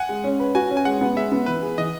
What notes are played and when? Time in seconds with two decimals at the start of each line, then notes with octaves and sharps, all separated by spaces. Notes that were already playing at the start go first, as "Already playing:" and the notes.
Already playing: F#5 G#5
0.09 G#3
0.24 C#4
0.40 B4
0.55 F#4 G#5
0.71 C#4
0.77 G#5
0.85 G#3 F#5
1.01 B3
1.16 G#3 E5
1.32 B3
1.46 E3 B4
1.62 G#4
1.78 E3 D#5